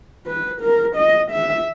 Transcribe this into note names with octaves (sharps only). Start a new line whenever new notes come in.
B4
A#4
D#5
E5